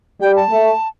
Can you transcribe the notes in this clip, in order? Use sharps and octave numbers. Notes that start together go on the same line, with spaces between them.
G3 G5
A5
A3